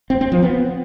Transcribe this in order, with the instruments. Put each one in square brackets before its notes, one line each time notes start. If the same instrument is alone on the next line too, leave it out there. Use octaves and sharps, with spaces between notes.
[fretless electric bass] C4
C4
F3
B3